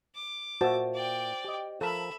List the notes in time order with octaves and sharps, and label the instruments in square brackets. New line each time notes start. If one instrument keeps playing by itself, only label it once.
[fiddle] D6
[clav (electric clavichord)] A#2 E5 [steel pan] F#4 A5 [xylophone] C5
[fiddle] D5 G5
[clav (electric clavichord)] G4 D#5
[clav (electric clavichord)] F3 A#4 [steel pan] A4 [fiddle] E5 B5